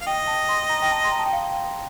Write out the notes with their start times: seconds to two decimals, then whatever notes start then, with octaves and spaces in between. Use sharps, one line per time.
0.01 F5
0.07 D#5 G5
0.27 A5
0.49 C6
0.70 A#5
0.82 G5
0.91 A5
1.04 C6
1.12 A#5
1.19 A5
1.26 G5
1.33 F5